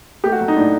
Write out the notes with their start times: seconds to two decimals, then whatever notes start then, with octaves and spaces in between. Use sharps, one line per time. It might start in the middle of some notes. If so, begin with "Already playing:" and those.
0.24 A3 G4
0.32 F#4
0.41 F#3
0.48 D#4
0.56 A2 D4